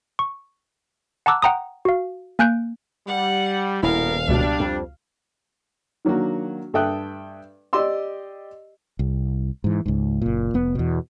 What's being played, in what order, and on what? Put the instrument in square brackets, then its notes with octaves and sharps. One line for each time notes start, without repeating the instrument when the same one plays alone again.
[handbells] C#6
F#5 A5 A#5 D6 E6 F#6
F#5 G5 A#5 C6 D#6
F#4 F5
A#3 G#5 F#6 G6 D7
[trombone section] G3 [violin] F#5
[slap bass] D#1 [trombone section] B2 B3 A#4 [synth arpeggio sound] E4 [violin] F5
[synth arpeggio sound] C#2 B2 [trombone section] G3 D4
[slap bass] F2
[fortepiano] D#3 F#3 A#3 D4 F#4
G2 A4 E5 G5 D#6 F#6
G4 D5 D#5 C6 E6
[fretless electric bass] C2
G#2 E3
C#2 G#2
F#1 A#2
F1 B3
E2 B2